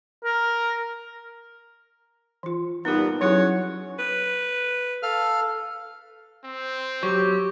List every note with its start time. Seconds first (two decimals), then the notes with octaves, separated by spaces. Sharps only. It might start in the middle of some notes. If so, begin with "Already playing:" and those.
0.25 A#4
2.43 E3 F4
2.85 G2 A#2 B3 D#4 G4
3.21 F#3 C#4 E4 F#4 G#4 C#5
3.99 B4
5.03 A4 F5 F6
6.45 C4
7.03 F#3 G4 C#6